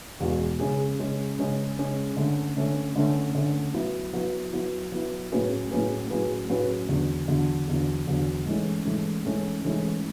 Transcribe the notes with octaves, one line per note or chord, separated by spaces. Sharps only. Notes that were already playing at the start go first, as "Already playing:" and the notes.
E2 B2 G#3
C#3 G#3 C#4 G#4
C#3 G#3 C#4 G#4
C#3 G#3 C#4 G#4
C#3 G#3 C#4 G#4
D3 A3 C#4
D3 A3 C#4
D3 A3 C#4
D3 A3 C#4
F#3 B3 E4
F#3 B3 E4
F#3 B3 E4
F#3 B3 E4
A2 F#3 C#4 G#4 B4
A2 F#3 C#4 G#4 B4
A2 F#3 C#4 G#4 B4
A2 F#3 C#4 G#4 B4
E2 D3 F#3
E2 D3 F#3
E2 D3 F#3
E2 D3 F#3
G#2 E3 A3 C#4
G#2 E3 A3 C#4
G#2 E3 A3 C#4
G#2 E3 A3 C#4